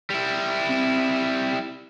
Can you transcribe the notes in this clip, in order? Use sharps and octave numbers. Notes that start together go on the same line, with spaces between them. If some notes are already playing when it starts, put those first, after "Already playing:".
G3 E4
C4